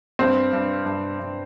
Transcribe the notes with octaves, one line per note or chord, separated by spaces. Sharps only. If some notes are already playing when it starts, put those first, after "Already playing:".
G2 C4
G2
G2
G2